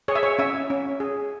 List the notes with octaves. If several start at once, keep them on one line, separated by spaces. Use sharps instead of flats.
G#4 C#5
E5
C#5
C#4 E5
C#4
G#4